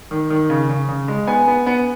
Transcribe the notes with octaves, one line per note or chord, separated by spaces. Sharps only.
D#3
D#3
C#3
C#3
C#3
G#3
B3 G#5
B3
B3